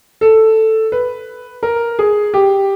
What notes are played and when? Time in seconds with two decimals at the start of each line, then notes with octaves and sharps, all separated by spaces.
0.21 A4
0.92 B4
1.63 A#4
1.99 G#4
2.34 G4